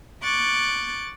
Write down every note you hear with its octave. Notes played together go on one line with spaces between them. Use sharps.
C#6 D6 F#6 G6 A6